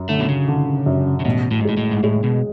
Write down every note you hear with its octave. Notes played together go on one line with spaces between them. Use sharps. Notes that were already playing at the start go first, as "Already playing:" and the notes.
Already playing: F#2
D3 A3
B2
C#3
D3
F#2
C#3
A1 B2
A2
G#2
A2 G#3
A2
G#2
A2 G#3
B2